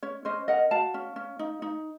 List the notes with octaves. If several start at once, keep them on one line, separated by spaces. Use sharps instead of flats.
C#4 C#5
C#4 C5 D#5
A#4 D#5 F#5
F#4 F5 A5
C#4
C#4
D#4
D#4